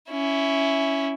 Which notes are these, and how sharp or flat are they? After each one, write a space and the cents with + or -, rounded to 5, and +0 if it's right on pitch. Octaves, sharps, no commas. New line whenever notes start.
C#4 +10 E4 +0